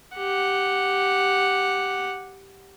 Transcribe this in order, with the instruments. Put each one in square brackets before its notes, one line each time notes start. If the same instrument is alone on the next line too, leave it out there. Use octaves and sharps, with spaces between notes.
[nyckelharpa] G4 F#5